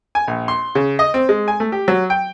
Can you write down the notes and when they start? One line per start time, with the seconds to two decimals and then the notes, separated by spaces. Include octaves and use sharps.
0.15 G#5
0.27 A#1
0.48 C6
0.75 C#3
0.99 D#5
1.14 C4
1.29 G#3
1.48 G#5
1.60 A3
1.72 G4
1.88 F#3
2.10 G5